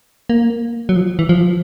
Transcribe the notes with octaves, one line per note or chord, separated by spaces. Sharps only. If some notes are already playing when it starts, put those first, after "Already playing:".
A#3
F#3
F3
E3
F3